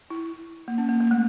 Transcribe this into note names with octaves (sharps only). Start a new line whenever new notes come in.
E4
A#3
C#4
A#3
A#3
A3